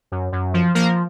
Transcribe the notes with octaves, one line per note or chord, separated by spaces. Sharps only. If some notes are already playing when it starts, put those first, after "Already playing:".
F#2
F#2
F3
F3 A#3 A#4